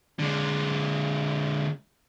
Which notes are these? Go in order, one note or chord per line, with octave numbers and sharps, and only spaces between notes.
D3 G#3